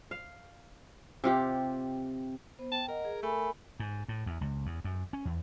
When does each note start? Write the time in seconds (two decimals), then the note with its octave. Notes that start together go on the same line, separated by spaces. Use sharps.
0.11 F5
1.24 C3 F4 G4
2.59 B3 C5
2.72 G5 A5
2.88 A#4 D#5 F#5
3.05 G#4
3.23 A3 A#4 G#5 B5
3.80 G#2
4.08 A2
4.26 E2
4.41 C#2
4.66 E2
4.84 F#2
5.13 C#4
5.25 E2